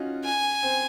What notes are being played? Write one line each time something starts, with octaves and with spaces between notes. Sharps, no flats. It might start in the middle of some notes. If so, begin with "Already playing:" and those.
Already playing: C#4 D#4 F4 F#4
G#5
C4